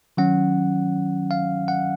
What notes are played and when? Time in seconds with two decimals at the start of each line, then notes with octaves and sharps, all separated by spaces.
0.17 D#3 F#3 C#4 F#5
1.31 F5
1.68 F#5